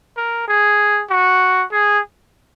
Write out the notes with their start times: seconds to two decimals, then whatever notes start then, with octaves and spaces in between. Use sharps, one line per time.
0.17 A#4
0.47 G#4
1.09 F#4
1.72 G#4